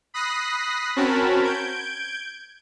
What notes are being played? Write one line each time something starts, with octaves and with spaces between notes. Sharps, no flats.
B5 D#6 F#6 A#6 C7
C4 C#4 F#4 A#4 A5 B5
G6 G#6 D7